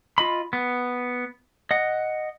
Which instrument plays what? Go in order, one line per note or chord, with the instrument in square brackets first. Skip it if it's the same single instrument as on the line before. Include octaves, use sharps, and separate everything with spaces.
[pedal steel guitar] F4 D#5 B5
B3
D#5 F#5